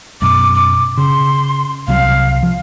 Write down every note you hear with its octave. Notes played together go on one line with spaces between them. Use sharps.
F#2 B2 D6
D6
C#3 C6
C2 C3 F#3 F5
F3